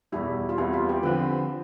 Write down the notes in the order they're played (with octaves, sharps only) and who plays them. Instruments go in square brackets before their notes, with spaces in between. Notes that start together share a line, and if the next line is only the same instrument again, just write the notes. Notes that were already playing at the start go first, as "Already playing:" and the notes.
[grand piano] E2 B2 G3 [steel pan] E4
[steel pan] F4
[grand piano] E2 C3 G3 B3 [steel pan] E4
[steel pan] F4
G4
[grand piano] D3 F3 C4 [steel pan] B4